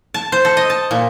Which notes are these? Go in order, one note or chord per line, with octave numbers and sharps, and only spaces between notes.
A5
C5
A4
D#5
A5
A#2